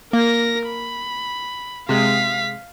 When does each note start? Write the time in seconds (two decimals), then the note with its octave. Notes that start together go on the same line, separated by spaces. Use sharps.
0.13 A#3 A#4 A#6
0.67 B5
1.89 C3 G#3 F5 B6